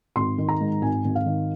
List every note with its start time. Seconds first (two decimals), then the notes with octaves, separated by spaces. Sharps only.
0.16 G#1 C6
0.38 D#3
0.49 A#5
0.61 G#2
0.82 G#1 G#5
1.05 G#1
1.15 F5
1.26 D#3